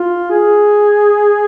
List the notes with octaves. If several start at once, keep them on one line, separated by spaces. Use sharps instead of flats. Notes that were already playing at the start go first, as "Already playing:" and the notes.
Already playing: F4
G#4